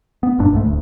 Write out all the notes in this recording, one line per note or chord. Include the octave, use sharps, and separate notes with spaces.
B3
F1 G2 A#2 D4
B1 G#2 G#3 A3
D1 D2